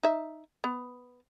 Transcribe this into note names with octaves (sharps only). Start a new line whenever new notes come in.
D#4 E5
B3